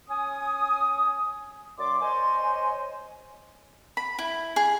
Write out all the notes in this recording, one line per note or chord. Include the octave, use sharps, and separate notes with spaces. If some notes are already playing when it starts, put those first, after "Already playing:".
C#4 G#5 D#6
F#2 D5 C6 D6
C5 C#5 D#5 G#5 C6
B5
E4
G#4